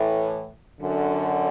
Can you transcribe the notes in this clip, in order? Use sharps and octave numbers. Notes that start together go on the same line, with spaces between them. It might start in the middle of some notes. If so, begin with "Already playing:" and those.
Already playing: A2 E3
F#2 D3